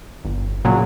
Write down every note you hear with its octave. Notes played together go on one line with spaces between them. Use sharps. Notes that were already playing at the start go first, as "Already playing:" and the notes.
G1
A#2 C#3 F#3